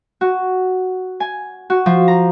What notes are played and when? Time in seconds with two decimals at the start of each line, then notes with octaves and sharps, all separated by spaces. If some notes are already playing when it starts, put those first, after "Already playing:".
0.21 F#4
1.20 G#5
1.70 F#4
1.86 F3
2.08 A#5